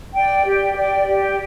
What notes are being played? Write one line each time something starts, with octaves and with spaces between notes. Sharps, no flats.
D5 G5
G4
D5 G5
G4